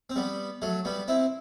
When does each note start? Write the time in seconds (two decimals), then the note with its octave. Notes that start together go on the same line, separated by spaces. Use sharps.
0.10 C4
0.16 G3 B3
0.62 F#3 A3
0.85 G3 B3
1.08 C4 E4